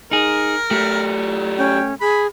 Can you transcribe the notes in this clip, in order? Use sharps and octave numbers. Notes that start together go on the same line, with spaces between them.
D#4 G#4 A#4
F#3 A3 G4
C#4 G5
G#4 B5